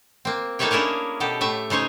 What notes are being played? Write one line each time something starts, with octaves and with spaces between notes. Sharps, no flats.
A#3 C4
A#3 D#4 A4 B4 C#5 G5
C#4 D4 E4 G#4 A#4 C#5
B2 G4 A4
A2 A3 E5
C#3 D#4 C5 C#5 G#5